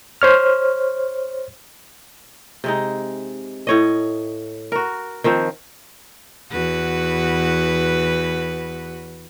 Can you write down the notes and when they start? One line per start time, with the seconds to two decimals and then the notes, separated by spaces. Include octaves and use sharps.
0.22 C5 C#5 F6
2.64 C3 G#3 D#4
3.67 A2 C#5 D#5
4.72 F#4 A#4
5.24 D#3 F3 C4
6.51 E2 F#4 B4